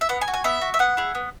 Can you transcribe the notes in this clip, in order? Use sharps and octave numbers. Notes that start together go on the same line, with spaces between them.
E5
B3 F#5
G#5
F#4
G#5
B3 E5
F#4
E5
B3 F#5
E4 G#4
B3